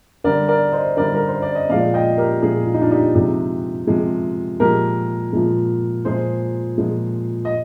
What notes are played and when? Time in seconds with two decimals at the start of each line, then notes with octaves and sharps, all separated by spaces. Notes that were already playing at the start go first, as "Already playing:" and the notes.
0.24 D3 G3 A#4 D5
0.48 A#4 D5
0.72 C5 D#5
0.97 D3 G3 A#4 D5
1.15 A#4
1.28 C5
1.42 D5
1.55 D#5
1.69 A#2 F3 G#3 D5 F5
1.94 D#5 G5
2.18 G4 A#4
2.42 A#2 F3 G#3 F4 G#4
2.66 F4
2.74 D#4
2.81 D4 F4
2.91 D#4 G4
3.15 C3 F3 G#3
3.87 C3 F3 G#3
4.60 A#2 F3 G#3 G4 A#4
5.33 A#2 F3 G#3
6.05 A#2 F3 G#3 G#4 C5
6.78 A#2 F3 G#3
7.45 D#5